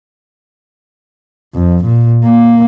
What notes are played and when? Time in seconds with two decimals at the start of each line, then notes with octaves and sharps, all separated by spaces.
1.55 F2
1.85 A#2
2.25 A#3